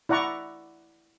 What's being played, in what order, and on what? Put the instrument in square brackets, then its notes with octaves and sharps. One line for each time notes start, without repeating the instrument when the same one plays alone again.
[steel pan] E4 D5 F#5 A#5 C#6